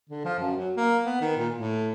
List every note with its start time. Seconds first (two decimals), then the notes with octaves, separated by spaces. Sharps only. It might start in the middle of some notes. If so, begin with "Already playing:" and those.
0.09 D3
0.25 F3
0.38 F#2
0.57 F#3
0.77 A#3
1.05 B3
1.21 D#3
1.37 A#2
1.55 A2